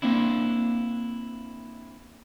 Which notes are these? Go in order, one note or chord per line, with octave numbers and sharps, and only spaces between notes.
A#3 C4 D4 E4